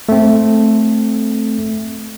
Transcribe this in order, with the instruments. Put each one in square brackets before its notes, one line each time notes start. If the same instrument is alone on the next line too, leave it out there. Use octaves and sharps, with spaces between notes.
[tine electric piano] A3 C4